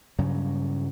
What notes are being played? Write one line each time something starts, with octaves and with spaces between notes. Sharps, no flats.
G2 C#3 F#3 G3